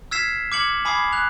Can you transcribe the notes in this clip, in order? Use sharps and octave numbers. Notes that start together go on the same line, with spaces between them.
E6 F6 G#6 B6 C7 E7
D6 F6 G#6 C#7 F#7
G#5 B5 D6 D#6 G#6 C7
F#6 F7